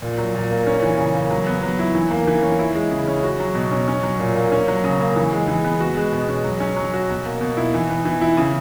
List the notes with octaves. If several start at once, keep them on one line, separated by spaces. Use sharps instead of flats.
A#2
F#3
A#2
A#3
C#4
E3
C#3
A#3
F#3
B3
F#3
E4
E3
A#3
E3
C#4
E4
G#3
C#3
C#4
F#4
F#3
B2
C#4
C#4
F#3
A#2
A#3
C#4
F#3
C#3
A#3
E3
G#3
E3
B3
F#4
G#3
B2
C#4
F#3
C#4
F#3
F#4
B2
A#3
B2
E4
E3
B3
E3
E4
C#3